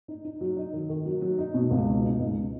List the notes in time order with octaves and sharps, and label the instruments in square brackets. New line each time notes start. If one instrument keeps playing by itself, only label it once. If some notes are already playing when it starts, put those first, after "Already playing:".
[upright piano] D#4
D#4
F#3
D#4
D#3
D#3
F#3
F#3
D#4
B2
C#2
B2
D#4
C#2